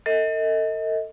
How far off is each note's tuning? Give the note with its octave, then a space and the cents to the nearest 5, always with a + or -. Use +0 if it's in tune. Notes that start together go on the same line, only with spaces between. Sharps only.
A4 +35 D#5 +30